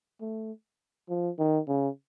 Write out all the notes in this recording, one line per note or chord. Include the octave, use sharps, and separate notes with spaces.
A3
F3
D#3
C#3